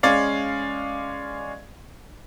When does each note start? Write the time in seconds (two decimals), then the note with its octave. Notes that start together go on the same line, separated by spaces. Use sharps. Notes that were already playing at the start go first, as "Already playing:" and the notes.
0.03 G#3 C#4 D5 F5